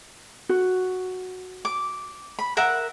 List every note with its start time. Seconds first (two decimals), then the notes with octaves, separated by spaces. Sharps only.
0.49 F#4
1.65 D6
2.39 B5
2.57 A#4 E5 F#5